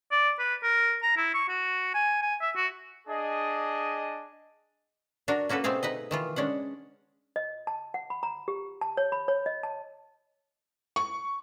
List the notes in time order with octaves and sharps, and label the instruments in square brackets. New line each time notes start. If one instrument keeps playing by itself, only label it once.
[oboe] D5
B4
A#4
A#5
E4
C#6
F#4
G#5
G#5
E5
F#4
[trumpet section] D4 G#4 D#5
[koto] D4 F#4 A#4
A#3 C#4 F#4 A4 B4
B2 A3 C4 G#4 F5
D#4 B4 D#5
D#3 E3 F4
G#3 C#4 D4 F#5
[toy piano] D#5
A5
F#5
B5
A#5
G4
A5
C#5
B5
C#5
D#5
A5
[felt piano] C#6